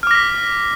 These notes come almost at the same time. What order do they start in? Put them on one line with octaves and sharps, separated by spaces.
F6 D6 A#6 B6